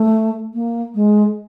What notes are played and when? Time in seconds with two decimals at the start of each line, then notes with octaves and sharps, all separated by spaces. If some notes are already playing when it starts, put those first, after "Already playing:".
Already playing: A3
0.54 A#3
0.95 G#3